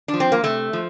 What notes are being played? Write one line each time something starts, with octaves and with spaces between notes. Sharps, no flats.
D4
F3
C4
A#3
C3 A3
F3